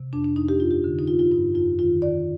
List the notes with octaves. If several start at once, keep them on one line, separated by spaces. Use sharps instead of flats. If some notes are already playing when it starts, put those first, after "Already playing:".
Already playing: C3
F2 D4
D4
F2 D#4
G4
G2 F4
G4
D3
D#4
D3 F4
F4
G2 D#4
F2 F4
D#3 F4
D#3 D5